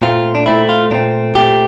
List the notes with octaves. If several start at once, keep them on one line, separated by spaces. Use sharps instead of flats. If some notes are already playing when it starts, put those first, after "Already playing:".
A#2 A3 C4 F4
D4
A#2 A3 C4 E4
F4
A#2 A3 C4 D4
A#2 A3 C4 G4